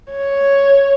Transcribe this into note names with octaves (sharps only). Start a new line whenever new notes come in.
C#5